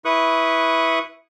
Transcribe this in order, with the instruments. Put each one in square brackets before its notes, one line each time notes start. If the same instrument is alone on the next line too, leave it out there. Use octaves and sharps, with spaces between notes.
[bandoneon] E4 B4 C#6 D#6 F#6